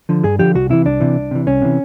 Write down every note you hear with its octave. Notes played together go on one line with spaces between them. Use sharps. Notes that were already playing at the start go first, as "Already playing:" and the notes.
D3 F3
G2 G#4
D3 F3 G4
C2 F#4
C3 E3 E4
C2 D4
C3 E3
C2
C3 E3
C2 C#4
C3 E3